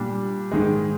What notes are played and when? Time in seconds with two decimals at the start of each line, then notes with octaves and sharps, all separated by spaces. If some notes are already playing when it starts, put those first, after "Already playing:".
Already playing: A#2 G3 D4
0.52 G#2 D#3 G#3